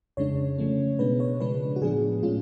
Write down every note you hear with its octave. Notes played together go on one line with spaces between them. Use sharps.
F2 C#3 G#3 D4 C#5
C#3 F3 A3 C#4
B2 G#3 B3 D4 B4
C#5
C#3 F3 G#3 D4 B4
F#4
A2 F3 B3 D4 G#4
A2 G#3 C#4 F4